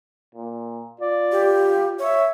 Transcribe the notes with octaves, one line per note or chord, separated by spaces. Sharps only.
A#2
F4 D5
G4
C#5 E5